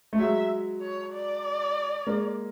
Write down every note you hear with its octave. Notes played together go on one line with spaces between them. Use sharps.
A3
F#3 G#3 E5
C#5
D5
G#3 A#3